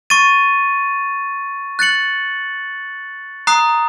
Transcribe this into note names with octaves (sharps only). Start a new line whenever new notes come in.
C#6 A6 D#7
F#6 A6 C#7 F#7
A#5 D#6 F#6 C7